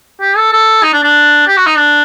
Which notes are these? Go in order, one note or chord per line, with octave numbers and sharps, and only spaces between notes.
G4
A4
A4
D#4
D4
D4
G4
F#4
D#4
D4